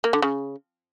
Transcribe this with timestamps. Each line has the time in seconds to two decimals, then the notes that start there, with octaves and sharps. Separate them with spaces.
0.04 A#3
0.13 D3
0.22 C#3